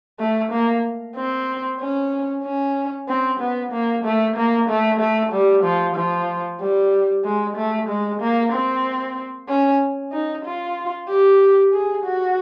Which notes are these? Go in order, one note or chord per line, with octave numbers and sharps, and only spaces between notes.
A3
A#3
C4
C#4
C#4
C4
B3
A#3
A3
A#3
A3
A3
G3
F3
F3
G3
G#3
A3
G#3
A#3
C4
C#4
D#4
F4
G4
G#4
F#4